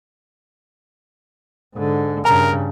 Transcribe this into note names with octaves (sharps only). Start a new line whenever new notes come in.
G#2 D3
G2 C#3 A#4 A5 A#5